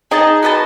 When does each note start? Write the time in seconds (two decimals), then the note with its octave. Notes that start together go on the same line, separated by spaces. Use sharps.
0.11 D#4 G#4 D#5 A5
0.43 F#4 B4 D#5 A5